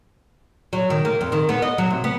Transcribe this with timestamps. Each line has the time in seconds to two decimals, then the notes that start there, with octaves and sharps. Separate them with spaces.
0.73 F#3
0.90 D#3
1.05 A#3
1.21 F2
1.32 D#3
1.49 B3
1.62 D#5
1.78 F#3
1.90 C3
2.04 B3